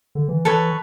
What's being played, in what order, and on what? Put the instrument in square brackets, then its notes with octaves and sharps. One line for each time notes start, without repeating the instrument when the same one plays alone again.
[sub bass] D3
E3
[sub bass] E3 [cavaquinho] A4 B4 C#5